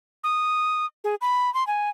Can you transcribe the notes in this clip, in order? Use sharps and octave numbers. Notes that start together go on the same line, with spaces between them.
D#6
G#4
B5
C6
G#5